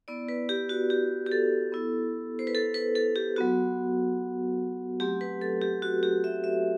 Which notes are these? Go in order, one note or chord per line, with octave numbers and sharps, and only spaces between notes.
B3 E4 D5
B4
G4
F#4
G4
G4
A4
B3 E4
C5
B4
A4
B4
A4
G4
F#3 B3 F#4
F#3 A3 C4 G4
B4
A4
G4
F#4
G4
E5
E5